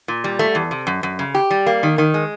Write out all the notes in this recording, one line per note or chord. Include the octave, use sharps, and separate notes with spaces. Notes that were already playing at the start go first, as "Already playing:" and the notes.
A#2
G3
A3
E2
C3
F#2
F#2
C#3
G4
G3
A#3
D#3
D#3
G#3